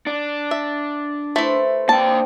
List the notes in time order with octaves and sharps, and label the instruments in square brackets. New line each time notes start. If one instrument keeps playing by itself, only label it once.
[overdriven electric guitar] D4
[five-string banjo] E5
[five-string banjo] A3 E4 [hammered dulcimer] B4 C5
[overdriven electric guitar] A#3 G5 [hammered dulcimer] C4 D4 G4 [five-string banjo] A5